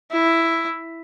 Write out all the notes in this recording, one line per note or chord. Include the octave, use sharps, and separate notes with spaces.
E4